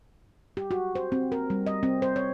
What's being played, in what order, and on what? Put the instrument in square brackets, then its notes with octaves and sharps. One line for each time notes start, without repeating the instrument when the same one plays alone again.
[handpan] G4
F#4
C5
C4
A#4
G3
D#5
C4
C5
C#5